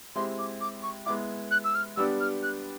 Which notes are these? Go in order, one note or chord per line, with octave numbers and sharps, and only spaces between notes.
G#3 C4 E4 G4 C6
D6
D6
C#6
G#3 B3 E4 D6
F#6
E6
F6
G3 B3 D4 G4 E6
F6
F#6